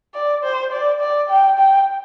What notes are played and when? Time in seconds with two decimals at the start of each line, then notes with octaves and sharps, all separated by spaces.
0.14 D5
0.43 C5
0.72 D5
1.00 D5
1.29 G5
1.58 G5